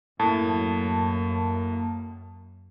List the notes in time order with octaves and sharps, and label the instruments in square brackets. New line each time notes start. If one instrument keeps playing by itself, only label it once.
[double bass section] F#2 [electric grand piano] A2 [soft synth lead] A#3 [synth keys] A5